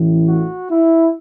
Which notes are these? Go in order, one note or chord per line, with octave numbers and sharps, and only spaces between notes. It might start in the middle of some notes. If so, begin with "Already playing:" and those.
Already playing: A1 A2 E3
F#4
E4